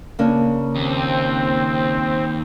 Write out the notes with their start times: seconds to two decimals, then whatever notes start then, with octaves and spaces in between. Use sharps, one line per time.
0.19 C#3 A#3 D4
0.76 D#2 C4